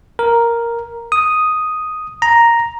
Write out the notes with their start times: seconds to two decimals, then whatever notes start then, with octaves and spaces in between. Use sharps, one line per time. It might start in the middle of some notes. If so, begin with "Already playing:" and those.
0.19 A#4
1.12 D#6
2.22 A#5